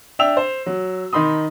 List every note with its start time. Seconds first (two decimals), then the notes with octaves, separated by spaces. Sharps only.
0.19 D4 E5 G5 E6 F7
0.37 C5
0.66 F#3
1.13 D#3 D#4 B5 C6 D#6